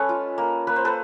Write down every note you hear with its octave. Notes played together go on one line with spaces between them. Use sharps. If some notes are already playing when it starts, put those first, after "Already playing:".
Already playing: G#3 C#4 A4 B4
F4
A#3
A#3 B4
C5
A4 B4